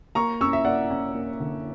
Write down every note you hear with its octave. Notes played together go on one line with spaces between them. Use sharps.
A#3 A#5 C#6
C#4 C#6 E6
E5
A#3 D5 F#5
C#4
A#3
D3